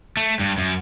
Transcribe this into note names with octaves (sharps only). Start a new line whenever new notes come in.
A3
G2
F#2